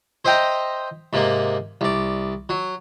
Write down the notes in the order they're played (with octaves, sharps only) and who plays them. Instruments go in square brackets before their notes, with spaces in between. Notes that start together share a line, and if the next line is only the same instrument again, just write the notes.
[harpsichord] C5 D#5 E5 G5 A#5
G#2 C3 A#3
C2 D5
F#3